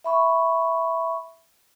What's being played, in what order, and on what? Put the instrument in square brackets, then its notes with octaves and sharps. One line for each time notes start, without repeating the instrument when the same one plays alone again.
[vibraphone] E5 B5 C#6